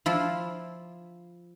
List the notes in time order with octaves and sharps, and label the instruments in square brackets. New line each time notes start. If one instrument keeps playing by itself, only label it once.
[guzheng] F3 E4 F4